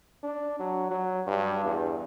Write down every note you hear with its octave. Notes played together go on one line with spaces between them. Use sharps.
D4
F#3
F#3
G2
E2